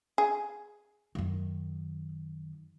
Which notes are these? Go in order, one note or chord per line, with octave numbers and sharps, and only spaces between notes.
G#4
F#2 D#3